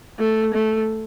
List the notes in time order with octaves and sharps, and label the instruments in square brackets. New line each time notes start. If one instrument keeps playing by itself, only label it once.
[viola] A3
A3